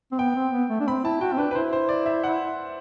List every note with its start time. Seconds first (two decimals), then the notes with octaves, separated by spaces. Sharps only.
0.12 C4
0.19 B3 G5
0.36 C4
0.53 B3
0.70 A3
0.81 D4
0.87 C4 B5
1.04 E4 A5
1.21 F#4 G5
1.33 C4
1.38 D4 B4
1.51 B4
1.55 E4 C5
1.73 C5
1.89 D5
2.06 E5
2.24 F#5